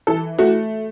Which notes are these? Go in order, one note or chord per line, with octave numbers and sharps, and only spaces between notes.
E3 A4
A3 F#4